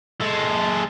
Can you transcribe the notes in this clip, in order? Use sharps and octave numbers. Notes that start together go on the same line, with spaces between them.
G#3 A4